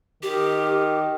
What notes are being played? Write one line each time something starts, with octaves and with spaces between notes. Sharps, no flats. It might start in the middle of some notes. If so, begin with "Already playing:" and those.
D#3 G4